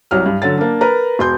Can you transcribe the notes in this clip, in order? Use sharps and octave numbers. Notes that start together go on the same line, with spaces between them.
C2 F#3 F6
G2
D3 F#3 A6
A#3 D4
A#4 B4 A#5
E1 C6 G6